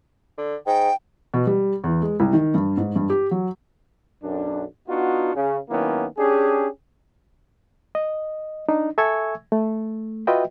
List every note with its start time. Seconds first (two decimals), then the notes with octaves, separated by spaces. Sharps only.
0.38 D3
0.67 G#2 G5
1.34 B2
1.47 G3
1.84 E2
2.02 G#3
2.20 C2
2.33 D#3
2.54 G2
2.77 G#2
2.96 G2
3.10 G4
3.31 F#3
4.23 B1 F#2 D4
4.88 B3 D4 D#4 F4 F#4
5.35 C#3
5.70 D#3 F#3 A#3 B3 C#4 E4
6.18 C#4 D4 G4 G#4
7.95 D#5
8.69 D4 D#4
8.98 A4 E5 G#5 C#6 E6 G#6
9.52 A3
10.27 F4 F#4 B4 D#5 E5 G5